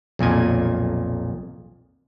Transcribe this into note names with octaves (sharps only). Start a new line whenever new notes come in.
B1 F2 A#2 G#5